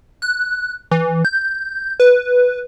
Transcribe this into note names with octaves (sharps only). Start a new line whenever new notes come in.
F#6
E3
G6
B4